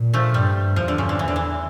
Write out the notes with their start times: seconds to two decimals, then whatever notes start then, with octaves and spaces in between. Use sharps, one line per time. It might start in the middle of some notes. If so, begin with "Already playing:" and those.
Already playing: A#2
0.14 F3 A3
0.34 G2 G3
0.76 E2 F3
0.88 D3
0.98 C#3
1.09 D3
1.19 E2 E3
1.28 D3
1.36 E3